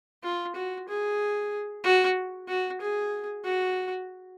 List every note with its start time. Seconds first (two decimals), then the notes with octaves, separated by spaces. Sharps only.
0.23 F4
0.55 F#4
0.88 G#4
1.84 F#4
2.48 F#4
2.81 G#4
3.44 F#4